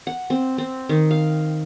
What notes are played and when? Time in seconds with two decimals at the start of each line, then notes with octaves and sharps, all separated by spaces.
0.07 F#5
0.30 C4
0.58 C4
0.89 D#3
1.11 F5